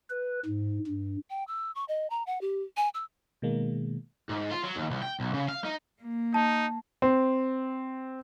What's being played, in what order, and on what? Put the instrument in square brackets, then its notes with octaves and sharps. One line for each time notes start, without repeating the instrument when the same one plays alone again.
[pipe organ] B4
G#2
G2
[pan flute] G5
E6
C#6
D#5
A#5
F#5
G4
G#5
E6
[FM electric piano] B2 D#3 G#3 A#3
[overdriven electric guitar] G#2
F4
F#3
D#2
C2
G5
B1
C#3
F5
D#4
[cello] A#3
[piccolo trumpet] D#4 [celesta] A5
[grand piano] C4